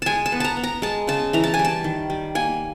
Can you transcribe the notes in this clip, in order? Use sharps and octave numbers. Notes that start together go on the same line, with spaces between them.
G#3 G#5 A5
A5
B3
A5 A#5
B3
A#5
G#3 A5
C#3 A5
E3 A#5
A5
G#5
G3
A5
D#3
G3
A#3 G#5